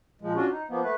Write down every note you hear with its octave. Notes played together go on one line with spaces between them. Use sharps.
A#2 F3 G#3
C#4 D4 F4 F#4
D#4
F3 A#3 B3
A3 B4